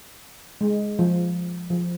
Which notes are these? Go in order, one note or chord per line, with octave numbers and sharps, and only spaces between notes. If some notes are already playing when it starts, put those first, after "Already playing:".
G#3
F3
F3